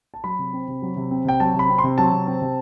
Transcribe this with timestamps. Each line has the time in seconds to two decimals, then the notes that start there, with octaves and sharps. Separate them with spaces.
0.14 A5
0.24 F#3 B5
0.39 C3
0.53 C4
0.68 C3
0.82 F#3
0.96 C3
1.11 C4
1.25 C3 G5
1.40 F#3 A5
1.54 C3
1.59 B5
1.69 C4
1.78 C6
1.84 C3
1.98 F#3 A5
2.12 C3
2.27 C4
2.42 C3